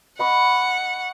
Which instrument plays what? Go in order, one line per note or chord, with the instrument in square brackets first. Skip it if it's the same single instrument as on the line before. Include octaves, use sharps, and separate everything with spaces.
[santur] D#5 B5 C#6 [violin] F#5